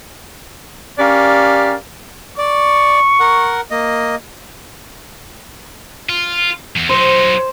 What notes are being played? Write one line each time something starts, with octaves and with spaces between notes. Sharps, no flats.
C#4 G4 A#4 D5 F5
D5 C#6
A#4 F#5
A#3 D#5
F4
E2
F#3 D#4 C5